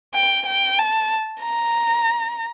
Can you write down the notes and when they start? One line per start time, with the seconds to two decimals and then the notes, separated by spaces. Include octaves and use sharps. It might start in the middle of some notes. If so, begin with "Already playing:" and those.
0.14 G5
0.46 G5
0.79 A5
1.42 A#5